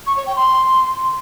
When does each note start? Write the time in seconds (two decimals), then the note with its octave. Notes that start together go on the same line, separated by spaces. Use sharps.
0.07 C#6
0.17 C#5
0.26 G5
0.36 C6